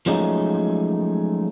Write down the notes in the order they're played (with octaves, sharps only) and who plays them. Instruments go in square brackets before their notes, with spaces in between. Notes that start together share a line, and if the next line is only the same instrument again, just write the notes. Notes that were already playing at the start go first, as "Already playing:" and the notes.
[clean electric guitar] F3 F#3 G#3 A3 C#4 D#4